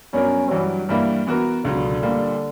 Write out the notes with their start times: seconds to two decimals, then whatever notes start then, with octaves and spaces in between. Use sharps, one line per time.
0.13 G2 F#3 B3 C#4 D4 A#4
0.51 G2 E3 F#3 G3
0.89 G2 E3 G3 A#3 E4
1.27 E3 B3 F#4 A#4
1.65 C#2 B2 D3 F#3 B3
2.02 A#2 G3 A#3